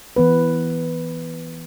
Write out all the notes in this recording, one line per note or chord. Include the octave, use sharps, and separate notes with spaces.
E3 B3 B4